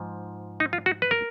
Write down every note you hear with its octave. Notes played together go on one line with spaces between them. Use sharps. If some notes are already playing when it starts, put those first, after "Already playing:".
Already playing: G#2 F3
D#4
F4
F#4
B4
A#4